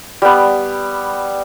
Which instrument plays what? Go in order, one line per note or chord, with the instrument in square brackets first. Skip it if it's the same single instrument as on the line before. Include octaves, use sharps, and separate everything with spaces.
[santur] G3 B3